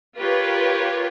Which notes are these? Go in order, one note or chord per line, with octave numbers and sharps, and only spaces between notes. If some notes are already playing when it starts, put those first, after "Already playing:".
F4 G4 A#4 B4 C#5